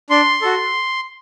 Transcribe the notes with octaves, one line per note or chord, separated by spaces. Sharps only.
D4 C6
F#4 A4